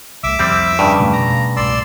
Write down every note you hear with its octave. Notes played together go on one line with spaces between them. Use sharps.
C2 A3 E5 D6 E6
F2 G3 C4
G2 C#3
B2 A3
A#5
C2 A2 D5 C6 E6